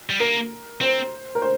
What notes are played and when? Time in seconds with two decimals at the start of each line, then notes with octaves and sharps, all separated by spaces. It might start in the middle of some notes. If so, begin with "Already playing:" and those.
0.10 G3
0.20 A#3 A#4
0.81 C4 C5
1.35 A#4
1.42 C5